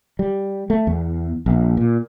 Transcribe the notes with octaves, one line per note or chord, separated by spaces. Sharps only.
G3
A3
E2
A#1
A#2